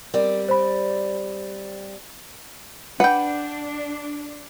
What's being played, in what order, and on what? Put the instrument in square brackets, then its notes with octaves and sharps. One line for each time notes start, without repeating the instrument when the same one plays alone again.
[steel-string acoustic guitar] G3 C4 D5 [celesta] A#4
[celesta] C5 B5
[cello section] D4 [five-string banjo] B4 G5 [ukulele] F#5